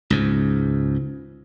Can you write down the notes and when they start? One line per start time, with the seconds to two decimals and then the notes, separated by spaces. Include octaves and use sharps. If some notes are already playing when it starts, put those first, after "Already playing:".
0.10 C#2 G#2